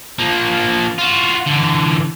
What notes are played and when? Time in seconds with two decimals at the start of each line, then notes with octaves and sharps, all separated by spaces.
0.19 F3 A#3
0.98 F4 F#4
1.46 D3 E3